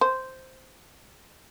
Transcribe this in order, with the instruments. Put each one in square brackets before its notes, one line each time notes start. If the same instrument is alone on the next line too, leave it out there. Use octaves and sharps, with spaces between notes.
[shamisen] C5